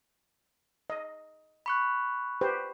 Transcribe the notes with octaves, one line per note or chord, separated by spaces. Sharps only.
D#5
B5 C#6 F#6
G4 B4 C5